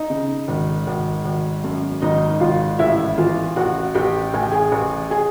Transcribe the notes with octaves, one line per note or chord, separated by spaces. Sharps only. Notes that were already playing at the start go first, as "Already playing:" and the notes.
Already playing: D#4 D#5
C#3
G#1
G#1
G#1
F#2
G#1 D#4 D#5
G#1 F4 F5
A1 E4 E5
E3 F4 F5
A1 F#4 F#5
A1 G4 G5
A1 G#5
G5
G#4 G#5
A1
G#4 G#5